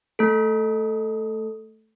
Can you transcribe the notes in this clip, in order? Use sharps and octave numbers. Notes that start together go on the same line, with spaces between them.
A3 A4